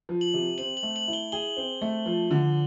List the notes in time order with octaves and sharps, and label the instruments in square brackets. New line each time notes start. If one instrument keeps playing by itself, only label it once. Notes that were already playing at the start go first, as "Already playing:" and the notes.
[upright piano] F3
[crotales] F#7
[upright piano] C3
[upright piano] C4 [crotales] F#7
[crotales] F#7
[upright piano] A3
[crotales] F#7
[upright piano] E4
[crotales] G7
[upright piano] G#4 [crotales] G7
[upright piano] C4
A3
F3
D3